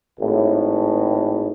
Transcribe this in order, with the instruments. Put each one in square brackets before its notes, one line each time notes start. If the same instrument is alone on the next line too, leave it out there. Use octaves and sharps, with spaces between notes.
[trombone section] G#1 A2